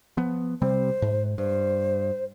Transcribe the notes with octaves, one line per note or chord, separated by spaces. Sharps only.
F3 B3
C3 G3 C4 C5
G#2
G2 C5